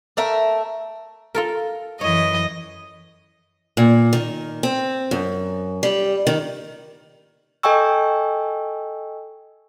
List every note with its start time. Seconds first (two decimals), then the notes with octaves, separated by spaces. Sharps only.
0.17 A3 A#4 E5
1.35 F4 A4 A#4
2.01 F#2 E3 C#5 D#5
3.77 A#2
4.13 D#3
4.63 C4
5.11 F#2
5.83 G3
6.27 D#3
7.63 A4 D#5 G5 G#5 C#6 E6